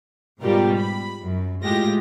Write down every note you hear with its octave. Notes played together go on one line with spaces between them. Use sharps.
G#2 B2 G3 F4 G4 A#4
B5
F#2
A2 G#3 F4 G4 A#6